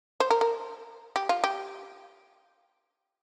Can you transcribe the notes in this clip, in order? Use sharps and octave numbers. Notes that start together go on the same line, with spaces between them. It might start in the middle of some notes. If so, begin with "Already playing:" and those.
C5
A#4
A#4
G4
F4
G4